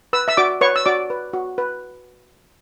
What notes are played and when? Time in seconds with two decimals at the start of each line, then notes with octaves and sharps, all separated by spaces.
0.13 B4 E6
0.28 E5 E6
0.37 F#4 D5 D6
0.61 B4 C#5 C#6
0.76 E6
0.86 F#4 D5 D6
1.10 B4
1.33 F#4
1.58 B4